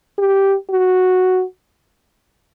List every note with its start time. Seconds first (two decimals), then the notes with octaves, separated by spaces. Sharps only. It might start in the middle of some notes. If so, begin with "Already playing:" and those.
0.18 G4
0.70 F#4